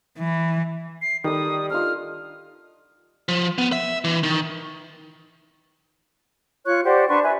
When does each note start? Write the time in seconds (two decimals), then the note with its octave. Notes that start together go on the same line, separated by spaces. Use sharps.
0.19 E3
1.02 C7
1.24 D#3 G3 A4 D5 D#6
1.70 D4 D#4 F4 F6
3.29 F3
3.58 B3
3.72 E5
4.04 E3
4.23 D#3
6.65 F4 C#5 C#6 F#6
6.84 G4 C5 D5 F#5
7.08 D4 B4 C6 C#6
7.23 B4 E5 G#5